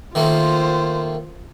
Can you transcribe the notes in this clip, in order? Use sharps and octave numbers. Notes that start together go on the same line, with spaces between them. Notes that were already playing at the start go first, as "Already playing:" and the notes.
D#3 A3 A#3 F4 C5